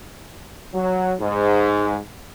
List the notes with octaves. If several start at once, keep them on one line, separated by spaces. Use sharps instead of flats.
F#3
G#2